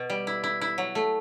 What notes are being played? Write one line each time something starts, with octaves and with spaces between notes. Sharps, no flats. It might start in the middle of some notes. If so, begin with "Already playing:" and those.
Already playing: B2
G3
E4
E4
E4
F#3
A3